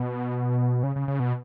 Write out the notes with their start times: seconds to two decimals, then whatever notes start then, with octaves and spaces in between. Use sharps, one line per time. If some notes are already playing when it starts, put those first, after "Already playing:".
Already playing: B2
0.83 C#3
0.96 C#3
1.08 C#3
1.20 B2